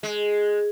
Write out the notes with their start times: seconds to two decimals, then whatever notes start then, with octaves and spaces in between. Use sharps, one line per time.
0.03 G#3